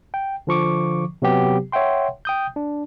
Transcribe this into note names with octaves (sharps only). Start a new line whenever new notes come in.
G5
D3 F3 C#6 D6
C3 F#3 B3 G4
C#5 E5 F#5 G5 C6
G5 D#6 G6
D4